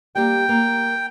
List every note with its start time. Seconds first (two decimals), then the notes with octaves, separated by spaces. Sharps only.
0.15 G3 A#3 G4 G5
0.49 A#3